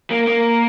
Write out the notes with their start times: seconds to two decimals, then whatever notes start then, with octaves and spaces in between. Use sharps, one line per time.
0.10 A#3
0.27 A#3